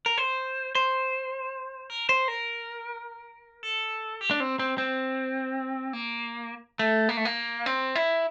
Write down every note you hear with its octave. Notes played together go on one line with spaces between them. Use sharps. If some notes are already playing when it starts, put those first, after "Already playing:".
A#4
C5
C5
A#4
C5
A#4
A4
G4
D4
C4
C4
C4
A#3
A3
A#3
A3
A#3
C4
E4